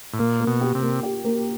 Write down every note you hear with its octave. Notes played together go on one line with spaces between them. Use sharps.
A2
A#2 A#3
A#3
B2
G4
C3
A#3
G4
A#3